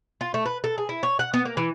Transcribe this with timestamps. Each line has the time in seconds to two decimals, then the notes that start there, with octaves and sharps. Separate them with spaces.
0.21 F4
0.34 A3
0.46 B4
0.64 A4
0.78 G#4
0.89 E4
1.03 C#5
1.19 F#5
1.34 B3
1.45 A#3
1.57 E3